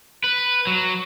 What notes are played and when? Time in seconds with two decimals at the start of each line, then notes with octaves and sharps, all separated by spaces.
0.24 B4
0.67 F#3